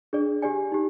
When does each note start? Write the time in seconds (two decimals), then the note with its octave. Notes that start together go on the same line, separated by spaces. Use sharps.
0.13 D4 G#4 D5
0.42 G4 D5 G#5
0.72 D#4 G4